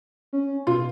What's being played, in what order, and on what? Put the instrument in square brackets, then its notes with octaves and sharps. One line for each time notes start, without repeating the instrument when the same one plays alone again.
[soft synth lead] C#4
[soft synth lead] B2 [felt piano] F4